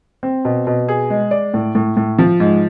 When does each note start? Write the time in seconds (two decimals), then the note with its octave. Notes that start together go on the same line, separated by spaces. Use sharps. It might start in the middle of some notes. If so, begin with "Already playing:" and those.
0.23 C4
0.45 B2
0.67 B2
0.89 G#4
1.10 G#3
1.31 D5
1.54 A2
1.75 A2
1.97 A2
2.19 F3
2.40 G#2